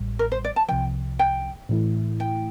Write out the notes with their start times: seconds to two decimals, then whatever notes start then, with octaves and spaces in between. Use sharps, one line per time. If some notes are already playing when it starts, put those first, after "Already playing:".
Already playing: A1 A2 G3
0.19 A#4
0.32 C5
0.44 D5
0.56 A5
0.68 C2 C3 F3 G5
1.19 G5
1.69 A2 E3 A3 E4
2.20 G5